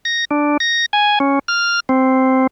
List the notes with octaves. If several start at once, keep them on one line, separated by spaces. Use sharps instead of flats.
A#6
D4
A#6
G#5
C#4
F6
C4